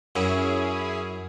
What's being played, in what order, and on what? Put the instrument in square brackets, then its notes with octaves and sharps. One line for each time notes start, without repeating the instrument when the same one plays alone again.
[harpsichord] F#2 [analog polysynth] C#4 E4 G#4